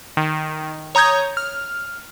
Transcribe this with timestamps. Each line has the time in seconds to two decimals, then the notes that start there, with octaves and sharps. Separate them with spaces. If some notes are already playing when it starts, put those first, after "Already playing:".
0.17 D#3
0.95 C#5 A#5 D#6 G6 G#6
1.37 F6